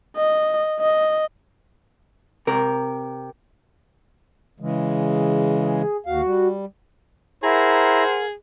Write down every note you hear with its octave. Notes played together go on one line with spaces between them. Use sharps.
D#5
D#5
C3 A#4
C#3 E3 G#3
G#4
D#2 F#4 F5
G3
E4 G#4 A#4 C5 F#5 A#5